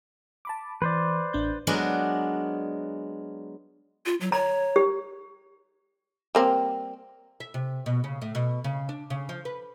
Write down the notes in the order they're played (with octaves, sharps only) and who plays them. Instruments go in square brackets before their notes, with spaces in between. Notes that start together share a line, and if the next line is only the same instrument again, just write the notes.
[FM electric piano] A5 B5 D6
[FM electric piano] E3 [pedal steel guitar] B4 C5 D5
[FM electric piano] A1 D4 G6
[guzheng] F#3 G#3 B3 D4 A#4
[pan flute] F4
F#3
[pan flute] C#5 [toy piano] A#5
[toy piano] G4
[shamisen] G3 A#3 C4
[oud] E5
C3
B2
C#3
A2
B2
C#3
D4
C#3
F3
B4